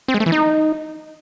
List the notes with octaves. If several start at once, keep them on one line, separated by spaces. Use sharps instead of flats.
C4
G#3
A3
E3
D#4